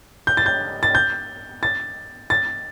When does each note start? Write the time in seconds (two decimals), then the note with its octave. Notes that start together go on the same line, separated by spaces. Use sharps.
0.27 G6
0.37 A6
0.46 G6
0.83 A6
0.95 G6
1.63 A6
2.30 A6